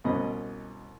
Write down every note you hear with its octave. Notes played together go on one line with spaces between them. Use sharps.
C2 B2 C#4 D#5 B5